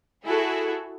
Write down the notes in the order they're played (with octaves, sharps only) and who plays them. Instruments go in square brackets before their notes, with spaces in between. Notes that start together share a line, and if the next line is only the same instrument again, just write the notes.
[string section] E4 F#4 G#4 A4